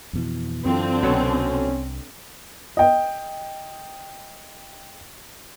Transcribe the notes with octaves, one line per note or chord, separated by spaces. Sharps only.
F2 B2 E3
F#2 D3 E3 C4 F4
C2 B2 F#3 C#4 A4
D#5 G5